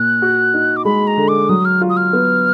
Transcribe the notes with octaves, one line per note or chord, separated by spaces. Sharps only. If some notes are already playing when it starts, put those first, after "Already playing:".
Already playing: A#2 F#6
F#4
D#4
D6
G#3 B5
A#5
D3
D6
F#3 D#6
F6
F4
D#6
F6
B3